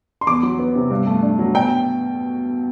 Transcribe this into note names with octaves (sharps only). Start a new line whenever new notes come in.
C6
E2 D6
F#3
B3
C3
G2
A3
D4
F#3
B2 G5